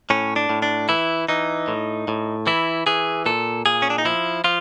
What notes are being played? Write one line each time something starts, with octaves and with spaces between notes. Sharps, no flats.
A2 C#4
D4
A2
D4
E3 E4
E3 D#4
A2
A2
E3 E4
E3 G#4
A#2 A4
A#2 G#4
C#4
D4
D#4
F3 E4
F3 F4